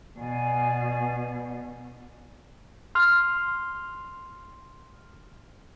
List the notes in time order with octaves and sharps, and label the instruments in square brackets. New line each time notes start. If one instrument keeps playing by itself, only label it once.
[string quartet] B2 [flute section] D5 G#5
[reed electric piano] C6 F6